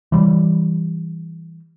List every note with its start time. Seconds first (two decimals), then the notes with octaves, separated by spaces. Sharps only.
0.12 E3 G3